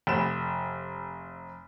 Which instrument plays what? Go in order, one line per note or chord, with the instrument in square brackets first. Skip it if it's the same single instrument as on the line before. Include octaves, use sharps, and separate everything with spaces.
[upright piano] F1 E7